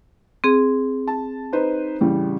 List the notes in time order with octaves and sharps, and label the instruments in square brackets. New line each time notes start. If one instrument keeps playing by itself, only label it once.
[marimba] C4 G#4
[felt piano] A5
D#4 B4 C5
A1 C#3 G3